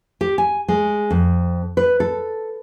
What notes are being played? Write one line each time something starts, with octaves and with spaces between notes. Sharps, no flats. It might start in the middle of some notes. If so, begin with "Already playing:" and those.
G4
G#5
G#3
F2
B4
A4